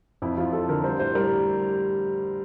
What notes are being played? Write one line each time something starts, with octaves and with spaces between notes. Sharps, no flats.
F2 E4
F3 F4
F3 A4
D3 A#4
G3 C5
A2 C5
G3 A#4